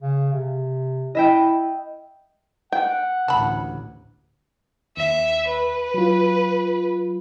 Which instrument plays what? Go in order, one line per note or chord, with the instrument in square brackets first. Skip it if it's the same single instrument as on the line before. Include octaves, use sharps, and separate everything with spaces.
[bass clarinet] C#3
C3
[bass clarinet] E4 [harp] D#5 E5 G5
[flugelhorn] F#5 [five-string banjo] G5
[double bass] A1 D2 [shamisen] A5 B5
[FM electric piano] D#2 [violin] E5
[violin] B4
[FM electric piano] F#3 F4